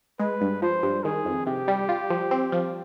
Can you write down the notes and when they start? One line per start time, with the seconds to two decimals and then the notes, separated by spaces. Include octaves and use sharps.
0.19 G#3 B4
0.41 G2
0.62 F3 C5
0.83 G2
1.04 D#3 G#4
1.25 F2
1.46 C3 G4
1.68 G3
1.89 F4
2.10 F3
2.31 C4
2.52 F3